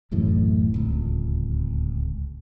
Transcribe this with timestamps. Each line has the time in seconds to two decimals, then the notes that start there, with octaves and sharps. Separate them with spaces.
0.11 D1 F#2 A2 E3
0.74 D1 C#2